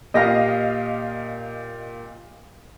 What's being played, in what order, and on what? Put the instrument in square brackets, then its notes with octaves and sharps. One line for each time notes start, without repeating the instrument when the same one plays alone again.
[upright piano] A#2 G4 A#6 [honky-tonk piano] D#5 F5